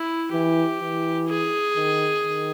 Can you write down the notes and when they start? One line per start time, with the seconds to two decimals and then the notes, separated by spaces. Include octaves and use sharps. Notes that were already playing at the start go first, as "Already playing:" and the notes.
Already playing: E4
0.32 E3 G4
0.80 E3
1.28 G#4
1.76 D#3
2.23 D#3